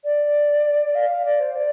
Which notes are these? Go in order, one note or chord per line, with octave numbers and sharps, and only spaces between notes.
D5
F5
D5
C5
D5